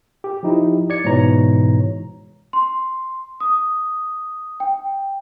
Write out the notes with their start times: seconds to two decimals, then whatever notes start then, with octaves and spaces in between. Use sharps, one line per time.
0.24 G4
0.43 F3 D#4 E4 G4
0.90 D5 G#6 C#7
1.04 G#2 B2 E3 C#5 A#5
2.53 C6
3.40 D#6
4.60 G5